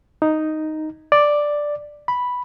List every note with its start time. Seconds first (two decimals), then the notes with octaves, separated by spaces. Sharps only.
0.22 D#4
1.12 D5
2.08 B5